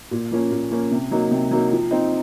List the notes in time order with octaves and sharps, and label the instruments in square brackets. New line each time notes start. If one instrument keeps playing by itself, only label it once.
[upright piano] A#2
F3 A#3 C#4
A#2
F3 A#3 C#4
C3
F#3 A#3 D#4
C3
F#3 A#3 D#4
F3
C4 D#4